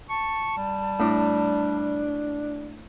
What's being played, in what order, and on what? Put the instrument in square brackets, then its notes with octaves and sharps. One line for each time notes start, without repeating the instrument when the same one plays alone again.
[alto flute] A5 [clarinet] C#6
[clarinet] G3
[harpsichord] A2 D6 [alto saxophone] D4